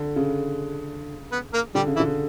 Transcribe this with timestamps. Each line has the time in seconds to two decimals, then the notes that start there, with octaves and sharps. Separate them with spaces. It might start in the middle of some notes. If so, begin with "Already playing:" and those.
Already playing: D3
0.16 C#3
1.32 B3 B4
1.53 A#3 A#4
1.75 D3 G3 G4
1.87 C#3
1.96 E3 E4
2.00 D3